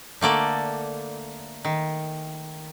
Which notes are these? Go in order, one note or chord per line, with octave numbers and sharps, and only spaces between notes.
D3 A3 A#3 D5
D#3